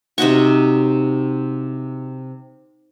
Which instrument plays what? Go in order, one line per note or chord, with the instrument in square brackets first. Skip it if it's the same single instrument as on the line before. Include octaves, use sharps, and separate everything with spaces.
[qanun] C3 D#4 F#4 C#6